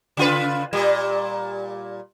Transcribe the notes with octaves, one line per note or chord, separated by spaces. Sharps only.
C#3 F4 B4
A#2 G3